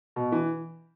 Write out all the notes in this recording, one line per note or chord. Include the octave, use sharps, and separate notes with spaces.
B2
E3